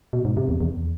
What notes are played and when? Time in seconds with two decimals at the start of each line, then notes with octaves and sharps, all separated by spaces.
0.13 B2
0.25 G#2
0.37 C3
0.49 E2
0.61 E2